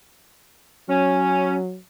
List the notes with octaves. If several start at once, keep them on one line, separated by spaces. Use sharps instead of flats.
F#3 C#4